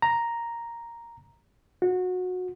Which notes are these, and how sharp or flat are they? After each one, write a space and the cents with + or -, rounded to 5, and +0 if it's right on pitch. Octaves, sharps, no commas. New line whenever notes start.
A#5 +0
F#4 -20